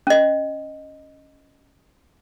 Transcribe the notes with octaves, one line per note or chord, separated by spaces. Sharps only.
C#4 D#5